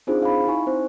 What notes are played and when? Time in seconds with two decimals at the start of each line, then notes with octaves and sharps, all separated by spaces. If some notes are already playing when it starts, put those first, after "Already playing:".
0.07 C4 D4 D#4 F4 G#4 C5
0.22 F5 B5
0.47 D#4 E4 F#4 G#5 C#6
0.67 C4 C5